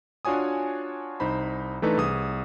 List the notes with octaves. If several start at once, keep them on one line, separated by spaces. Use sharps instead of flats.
D4 F4 F#4 C#5 G#5 D#6
C2 D#4 C5 B5
E3 A3 D4 D#4 A4 B4
C2 G#4 D#6